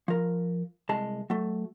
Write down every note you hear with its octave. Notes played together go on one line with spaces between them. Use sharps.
F3 A#4
C2 G#3 A5
F#3 A3